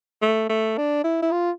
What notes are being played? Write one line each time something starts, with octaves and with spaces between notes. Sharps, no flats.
A3
A3
D4
E4
E4
F4